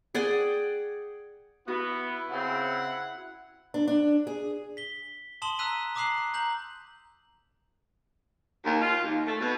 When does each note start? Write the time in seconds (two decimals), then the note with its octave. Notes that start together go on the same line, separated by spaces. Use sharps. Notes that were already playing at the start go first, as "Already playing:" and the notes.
0.15 G#4 D5 F#5 G5
1.68 B3 E4 F#4
2.31 C#3 C4 F#5
3.74 D4
3.88 D4
4.27 G#4
4.77 B6 G7
5.42 A5 C6 D#6 E7 F#7 G7
5.59 A#5 E6 F#6 B6 D#7
5.95 A#5 D6 D#6 F#6 C7 F#7
6.34 A#5 G6 F#7
8.64 D#2
8.82 F4
9.04 D#2
9.26 A3
9.40 B2